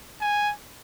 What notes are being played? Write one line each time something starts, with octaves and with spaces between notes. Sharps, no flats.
G#5